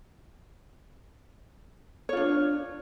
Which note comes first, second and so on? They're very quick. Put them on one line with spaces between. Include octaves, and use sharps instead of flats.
C#5 F4 D4